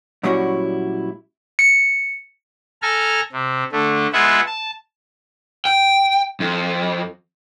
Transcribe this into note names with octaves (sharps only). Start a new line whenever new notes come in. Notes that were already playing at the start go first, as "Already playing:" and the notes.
A#2 F#3 G3 C#4 E4 F#4
C#7
A4 G#5 A#5 F6
C3
D3 A3
G#3 B3 F4 E5 F#5 G#5
A5
G5
F2